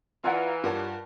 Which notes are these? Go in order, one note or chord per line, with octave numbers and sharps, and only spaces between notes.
E3 F4 D5 F5 F#5 G#5 A#5
G2 D4 F4 G4 A#4 C#5 F#5 A5